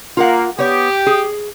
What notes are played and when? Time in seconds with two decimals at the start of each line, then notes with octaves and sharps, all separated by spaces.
0.17 A#3 F4 A#4 F#5
0.59 B3 G4 C#5
1.07 G#4